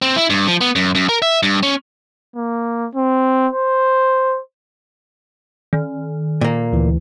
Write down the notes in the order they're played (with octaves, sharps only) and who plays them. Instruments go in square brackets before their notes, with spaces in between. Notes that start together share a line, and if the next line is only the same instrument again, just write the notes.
[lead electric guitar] C4
E4
G2
F3
B3
F#2
F#2
A#4
E5
G2
C#4
[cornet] A#3
C4
C5
[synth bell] D#3
[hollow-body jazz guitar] A#2 A#3
[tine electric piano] D2 E3